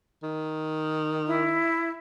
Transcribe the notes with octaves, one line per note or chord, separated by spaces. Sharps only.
D#3
E4